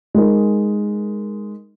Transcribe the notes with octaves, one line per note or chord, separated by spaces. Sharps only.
G#3 D#4 A#4